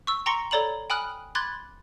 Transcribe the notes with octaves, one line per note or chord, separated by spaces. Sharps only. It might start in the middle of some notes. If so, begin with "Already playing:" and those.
C#6 E6
G5 A#5 C6 C#6 A#6 C#7
A4 C#5 D5 A#5 B5 F#7
G5 G#5 B5 D#6 F6 F#6
B5 C6 D6 F#6 G#6 A6